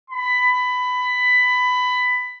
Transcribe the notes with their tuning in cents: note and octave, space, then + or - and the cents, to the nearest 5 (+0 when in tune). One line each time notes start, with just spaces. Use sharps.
B5 +15